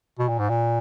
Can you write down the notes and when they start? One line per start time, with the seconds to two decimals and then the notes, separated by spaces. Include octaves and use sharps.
0.19 B2
0.28 A#2
0.39 G#2
0.49 A#2